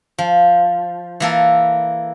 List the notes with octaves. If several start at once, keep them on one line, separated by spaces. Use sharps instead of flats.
F3
E3 A#3 A4